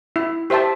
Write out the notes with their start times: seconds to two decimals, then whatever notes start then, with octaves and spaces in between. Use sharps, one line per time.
0.16 E4
0.50 G4 C5 E5 A5